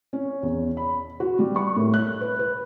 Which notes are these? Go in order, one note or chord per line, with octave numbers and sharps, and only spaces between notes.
C#4
E2
B5
F#4
G3
C#6
A2
F#6
B4
B4